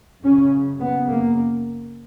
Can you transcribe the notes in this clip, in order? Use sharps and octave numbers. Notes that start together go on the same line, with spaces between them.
F#2 C#3 C#4
F#2 C#3 B3
A#3